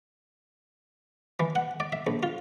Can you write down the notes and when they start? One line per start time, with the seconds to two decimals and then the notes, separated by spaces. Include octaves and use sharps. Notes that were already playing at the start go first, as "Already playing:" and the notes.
1.40 E3
1.55 F#5
1.80 D5
1.92 E5
2.07 A#1
2.23 F4